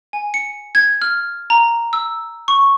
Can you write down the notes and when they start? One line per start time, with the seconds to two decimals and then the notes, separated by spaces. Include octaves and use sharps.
0.13 G#5
0.34 C#7
0.75 G#6
1.02 F6
1.50 A#5
1.93 E6
2.48 C#6